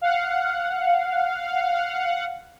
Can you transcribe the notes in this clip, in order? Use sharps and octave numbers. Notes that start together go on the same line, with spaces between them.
F5 F#5